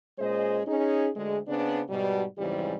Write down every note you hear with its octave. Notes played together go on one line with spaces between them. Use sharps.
A#2 G#3 C#4 G#4 C5 D#5
C#4 D#4 G#4
D2 G#3
C#3 B3 C4 D4
G#2 B2 G3
F2 G#2 C#3 E3 G3 G4